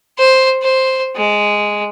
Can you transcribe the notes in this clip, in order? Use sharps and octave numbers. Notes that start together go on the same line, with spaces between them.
C5
C5
G#3